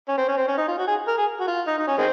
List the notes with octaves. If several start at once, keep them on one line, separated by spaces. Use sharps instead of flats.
C#4
C4
C#4
C4
C#4
D#4
F4
F#4
G#4
A#4
G#4
F#4
F4
D#4
D#4
C#4
D#3 G#3 C4